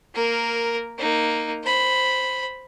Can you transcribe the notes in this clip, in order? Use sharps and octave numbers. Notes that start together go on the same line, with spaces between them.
A#3 A#4
A#3 D#4
C5 B5